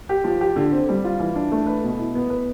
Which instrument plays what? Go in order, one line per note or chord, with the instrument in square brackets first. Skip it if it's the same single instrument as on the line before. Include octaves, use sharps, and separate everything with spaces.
[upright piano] G4
F3
G4
D3
C4
G3
F4
E3
D4
A3
B4
B2
E4
B3
B4